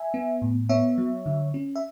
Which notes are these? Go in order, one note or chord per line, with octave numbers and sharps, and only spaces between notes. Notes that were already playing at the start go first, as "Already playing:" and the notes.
Already playing: E5 G#5
B3
A2
B3 C#5 E5
F#3
D3
C#4
E5